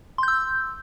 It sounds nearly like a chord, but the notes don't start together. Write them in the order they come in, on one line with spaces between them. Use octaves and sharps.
C6 G6 E6